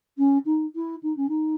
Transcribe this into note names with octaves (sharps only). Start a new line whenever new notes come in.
C#4
D#4
E4
D#4
C#4
D#4